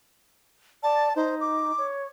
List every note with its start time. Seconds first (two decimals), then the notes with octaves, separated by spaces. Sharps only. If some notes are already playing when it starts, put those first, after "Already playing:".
0.83 D5 A5
1.16 D#4 C5
1.41 D6
1.78 C#5